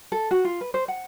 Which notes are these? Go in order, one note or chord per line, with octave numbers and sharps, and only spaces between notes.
A4
F#4
F4
B4
C5
F#5